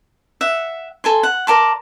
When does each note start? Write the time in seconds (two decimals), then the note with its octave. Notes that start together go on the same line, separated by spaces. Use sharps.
0.41 E5 F#5
1.04 A4 G#5 C6
1.23 F#5
1.47 A#4 D5 A5 C6